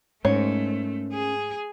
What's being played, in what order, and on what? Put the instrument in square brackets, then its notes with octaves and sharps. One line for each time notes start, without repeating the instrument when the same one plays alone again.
[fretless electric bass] G#2 [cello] A3 [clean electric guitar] C#4 A#4 C5 [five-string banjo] C#5
[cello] G#4